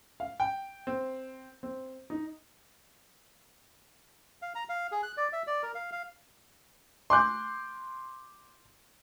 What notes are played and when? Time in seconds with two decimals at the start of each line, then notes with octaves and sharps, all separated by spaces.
0.20 F5
0.40 G5
0.87 C4
1.63 C4
2.10 D#4
4.42 F5
4.55 A#5
4.69 F5
4.92 G#4
5.03 F#6
5.17 D5
5.33 E5
5.47 D5
5.63 A#4
5.75 F5
5.92 F5
7.10 C6 D6 F#6 G6